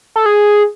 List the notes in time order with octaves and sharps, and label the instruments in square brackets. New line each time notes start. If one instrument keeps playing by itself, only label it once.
[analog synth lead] A4
G#4